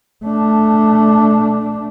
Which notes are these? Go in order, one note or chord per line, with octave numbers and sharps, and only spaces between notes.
A3 D4